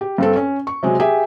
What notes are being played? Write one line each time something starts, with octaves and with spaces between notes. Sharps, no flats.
G4
G2 C4 A4
C#4
C#6
C3 F#3 G#3
G4 G#4 E5 G#5